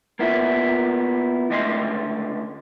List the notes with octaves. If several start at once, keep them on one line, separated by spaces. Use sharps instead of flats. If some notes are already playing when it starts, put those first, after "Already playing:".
A#3 B3 E4 F4
C#2 D3 A3 D#5 F5 C6